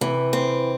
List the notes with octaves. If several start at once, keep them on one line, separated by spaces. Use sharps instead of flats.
C3 E3
C4